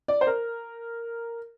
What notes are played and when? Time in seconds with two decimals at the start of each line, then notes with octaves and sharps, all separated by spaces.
0.08 D5
0.21 C5
0.27 A#4